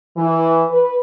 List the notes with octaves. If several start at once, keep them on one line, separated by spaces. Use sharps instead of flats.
E3
B4